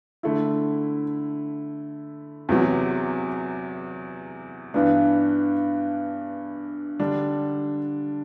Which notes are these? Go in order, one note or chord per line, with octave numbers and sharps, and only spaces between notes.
D3 A3 E4
E2 C3 F#3
G2 E3 B3 D4
D3 G3 D4